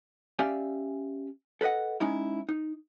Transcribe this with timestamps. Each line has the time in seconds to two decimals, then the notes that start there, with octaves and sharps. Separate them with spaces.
0.39 C#4 G4 D5 E5 F5 G#5
1.61 A4 B4 C5 D#5 F#5
2.00 G#3 C#4 D#4 E4
2.49 D#4